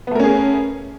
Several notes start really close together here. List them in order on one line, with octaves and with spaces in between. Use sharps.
B3 A3 A#4 C#4 G#4